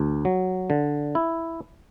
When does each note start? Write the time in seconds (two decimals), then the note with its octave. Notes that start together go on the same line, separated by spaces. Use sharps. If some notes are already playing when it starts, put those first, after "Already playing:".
Already playing: D2
0.25 F#3
0.70 D3
1.15 E4